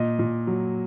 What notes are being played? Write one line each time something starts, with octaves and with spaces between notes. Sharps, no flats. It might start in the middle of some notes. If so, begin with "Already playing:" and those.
Already playing: A#2 D#5
A#2
F#3